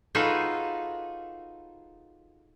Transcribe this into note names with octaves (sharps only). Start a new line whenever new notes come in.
D#4 F4 F#4 G#4 A4 B4